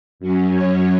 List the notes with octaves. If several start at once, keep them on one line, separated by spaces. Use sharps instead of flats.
F#2 F#3 C#4
C#5